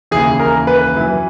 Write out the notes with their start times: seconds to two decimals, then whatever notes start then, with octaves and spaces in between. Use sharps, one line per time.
0.11 D#2 C#3 E3 G#4
0.40 A#4
0.67 B4
0.95 F#2 E3